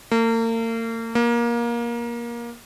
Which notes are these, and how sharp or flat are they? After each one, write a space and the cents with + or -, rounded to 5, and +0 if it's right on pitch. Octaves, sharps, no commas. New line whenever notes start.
A#3 -40
A#3 +20